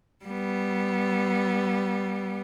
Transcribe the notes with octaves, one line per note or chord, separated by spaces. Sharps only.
G3 B3